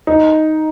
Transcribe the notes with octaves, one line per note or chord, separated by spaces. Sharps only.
D#4